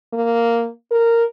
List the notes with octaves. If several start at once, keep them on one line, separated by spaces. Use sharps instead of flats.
A#3
A#4